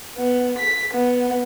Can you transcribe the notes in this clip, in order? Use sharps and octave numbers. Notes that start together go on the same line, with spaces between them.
B3
B6
B3